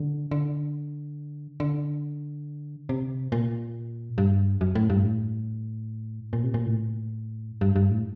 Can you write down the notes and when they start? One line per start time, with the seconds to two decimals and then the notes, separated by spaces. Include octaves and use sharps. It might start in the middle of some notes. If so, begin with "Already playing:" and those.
Already playing: D3
0.31 D3
1.60 D3
2.89 C3
3.32 A#2
4.18 G2
4.61 F#2
4.75 A2
4.90 G2
5.04 A2
6.33 A#2
6.44 C3
6.54 A#2
6.65 A2
7.61 G2
7.76 G2
7.90 A2